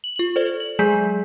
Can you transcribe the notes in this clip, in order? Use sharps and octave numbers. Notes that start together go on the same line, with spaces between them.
F#7
F4 F#7
A4 C5 D5
F#7
F#3 G#3 G#4 G#5 G6 B6